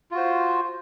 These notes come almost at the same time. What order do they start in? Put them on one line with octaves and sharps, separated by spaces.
F4 F#4 C5